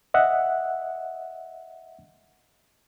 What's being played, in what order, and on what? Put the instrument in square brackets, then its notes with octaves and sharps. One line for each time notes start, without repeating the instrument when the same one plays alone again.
[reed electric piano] D#5 E5 F#5